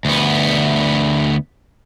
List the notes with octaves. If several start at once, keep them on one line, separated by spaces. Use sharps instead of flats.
D2 B3